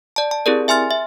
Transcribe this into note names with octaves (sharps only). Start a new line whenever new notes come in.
D5 A5
A5
C4 E4 G4 G#4 A#4 D5
E5 G#5 C6 F6 A6
E5